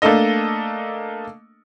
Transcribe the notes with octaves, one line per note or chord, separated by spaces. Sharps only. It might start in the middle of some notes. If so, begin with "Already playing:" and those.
A3 A#3 D4 A4 D#5